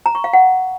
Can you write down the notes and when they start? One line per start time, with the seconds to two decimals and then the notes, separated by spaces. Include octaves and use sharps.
0.06 A#5
0.15 C#6
0.24 F5
0.33 F#5